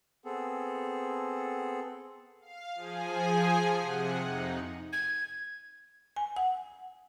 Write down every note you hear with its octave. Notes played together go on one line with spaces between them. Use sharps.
B3 C4 G#4 A4
F5
F3 G#4 G#5
C3 F#5
F2 D#4
G#6
G#5
F#5